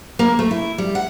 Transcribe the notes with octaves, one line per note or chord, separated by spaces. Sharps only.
A#3
A3
E4
G3
F#5